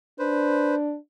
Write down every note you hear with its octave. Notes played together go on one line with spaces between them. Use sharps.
D4 B4 C5